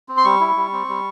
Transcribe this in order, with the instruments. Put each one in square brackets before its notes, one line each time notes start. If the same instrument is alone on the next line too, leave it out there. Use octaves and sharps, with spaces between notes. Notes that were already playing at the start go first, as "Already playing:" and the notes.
[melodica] C4
C6
G3 C#6
E4
G3
C4
G3